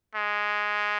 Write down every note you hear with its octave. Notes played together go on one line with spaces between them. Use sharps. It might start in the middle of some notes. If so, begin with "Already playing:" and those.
G#3